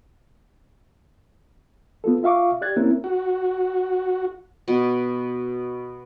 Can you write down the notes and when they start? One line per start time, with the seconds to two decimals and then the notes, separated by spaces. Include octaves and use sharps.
2.04 B3 F4 A4
2.23 F4 E5 F5 C#6 D6
2.61 G4 D5 F#6 G#6 A6
2.76 A#3 C4 C#4 E4 A#4
3.04 F#4
4.68 B2